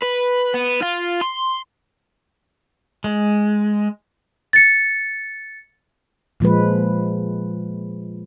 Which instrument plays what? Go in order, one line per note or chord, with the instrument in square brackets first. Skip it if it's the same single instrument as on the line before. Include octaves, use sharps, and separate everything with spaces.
[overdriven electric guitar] B4
B3
F4
C6
[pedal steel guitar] G#3
[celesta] A6 C#7
[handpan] A#2 F3 G#3 B4